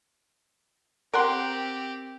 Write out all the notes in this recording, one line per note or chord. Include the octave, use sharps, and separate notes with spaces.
C4 G4 A#4 F#5 C6